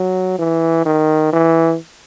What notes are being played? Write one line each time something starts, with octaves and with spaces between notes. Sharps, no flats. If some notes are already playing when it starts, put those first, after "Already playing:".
Already playing: F#3
E3
D#3
E3